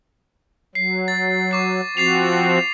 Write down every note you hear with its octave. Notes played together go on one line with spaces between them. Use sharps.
F#3 C7
A6
C#6 D6 C7
F3 C4 F#4 A6 C7 F7